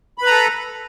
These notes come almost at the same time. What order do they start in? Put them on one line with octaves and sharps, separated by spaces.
B5 B4 A#5 A4